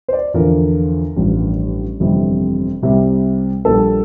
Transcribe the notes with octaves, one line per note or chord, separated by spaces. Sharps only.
C5
D5
E2 D3 F3 A#4
A1 G2 F3
G1 F2 C3 E3 G3
C2 C3 G3
A#1 A#2 G3 A4